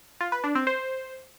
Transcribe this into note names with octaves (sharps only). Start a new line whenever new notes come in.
F4
B4
D4
C4
C5